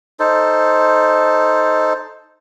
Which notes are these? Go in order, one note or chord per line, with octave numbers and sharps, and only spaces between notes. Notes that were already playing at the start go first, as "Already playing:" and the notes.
D#4 A4 C5